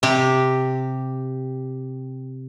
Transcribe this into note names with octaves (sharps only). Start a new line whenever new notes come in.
C3 G4